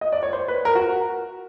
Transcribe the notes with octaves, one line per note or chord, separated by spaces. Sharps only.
D#5
D5
C#5
C5
B4
A#4
F#4